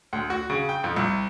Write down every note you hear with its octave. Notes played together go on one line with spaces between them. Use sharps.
D2
F#4
C#3
G5
F2
C2